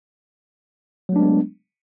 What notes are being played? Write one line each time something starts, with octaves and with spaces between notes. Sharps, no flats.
F#3 G#3 A3 B3 D4